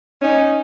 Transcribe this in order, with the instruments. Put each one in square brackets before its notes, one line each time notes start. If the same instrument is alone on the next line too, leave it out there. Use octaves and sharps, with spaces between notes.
[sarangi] C#4 [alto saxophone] D#4